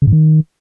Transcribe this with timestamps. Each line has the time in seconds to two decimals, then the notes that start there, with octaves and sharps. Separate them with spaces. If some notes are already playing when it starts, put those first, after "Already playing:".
0.02 C#3
0.07 G#2
0.12 D#3